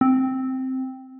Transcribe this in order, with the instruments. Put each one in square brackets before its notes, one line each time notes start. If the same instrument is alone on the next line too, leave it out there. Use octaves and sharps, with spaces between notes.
[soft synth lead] C4